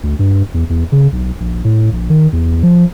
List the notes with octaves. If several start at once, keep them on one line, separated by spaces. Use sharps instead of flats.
D2
G2
E2
E2
C#3
B1
A#1
A2
A#1
D#3
E2
F3